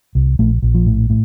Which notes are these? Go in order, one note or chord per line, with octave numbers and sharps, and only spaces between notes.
C2
A#1 A3
A#1
F3
A2
A2